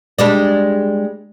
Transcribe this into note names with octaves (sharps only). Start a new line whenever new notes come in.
G3 G#3 D4